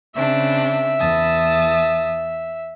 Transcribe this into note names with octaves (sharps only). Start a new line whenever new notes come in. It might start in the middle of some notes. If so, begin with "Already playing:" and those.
C#3 C4 D4 E5
E2 A5 D#6